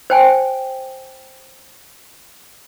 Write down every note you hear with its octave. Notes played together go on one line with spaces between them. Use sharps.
C5 G5 G#5